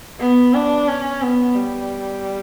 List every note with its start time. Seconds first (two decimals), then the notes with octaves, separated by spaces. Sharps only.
0.20 B3
0.54 D4
0.88 C#4
1.22 B3
1.55 G3